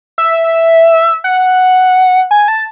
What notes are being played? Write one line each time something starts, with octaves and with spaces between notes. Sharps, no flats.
E5
F#5
G#5
A5